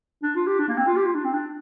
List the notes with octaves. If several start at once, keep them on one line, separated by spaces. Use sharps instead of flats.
D4
F4
G4
D4
A#3
C4
F4
G4
F4
D4
C4
D4